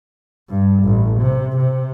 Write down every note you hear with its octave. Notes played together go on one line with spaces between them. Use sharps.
G2
A1
C3
C3